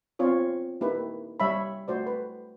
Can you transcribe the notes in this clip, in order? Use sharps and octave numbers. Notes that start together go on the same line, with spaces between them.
B3 C4 F4 C#5 D5
A#3 D#4 E4 G4 B4
G3 C#5 E5 F5 B5
A3 F#4 C5 D5
B4